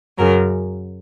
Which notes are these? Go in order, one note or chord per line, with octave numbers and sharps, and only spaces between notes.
F#2 C#3 F#3 A#4